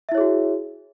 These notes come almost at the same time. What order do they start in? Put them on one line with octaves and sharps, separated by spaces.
E5 E4 C#5 G#4 F#4